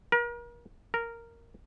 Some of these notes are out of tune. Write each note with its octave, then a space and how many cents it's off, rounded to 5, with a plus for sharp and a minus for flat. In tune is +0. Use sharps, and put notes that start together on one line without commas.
A#4 +40
A#4 -5